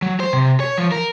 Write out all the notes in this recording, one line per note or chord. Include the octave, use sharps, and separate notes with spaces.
F#3
C5
C3
C#5
F3
A#4